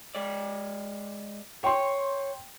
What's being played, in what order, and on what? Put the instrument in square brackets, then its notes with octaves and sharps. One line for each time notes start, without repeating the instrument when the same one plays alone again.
[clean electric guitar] G#3 D5
[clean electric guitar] C#5 [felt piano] G5 C6